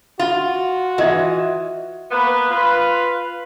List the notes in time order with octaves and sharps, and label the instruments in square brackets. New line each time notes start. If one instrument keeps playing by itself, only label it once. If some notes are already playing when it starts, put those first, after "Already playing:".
[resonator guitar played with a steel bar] F4 [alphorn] F#4
[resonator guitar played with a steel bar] E3 [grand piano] F4 D#5 G#6
[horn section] A#3 B3 B4
F4 B4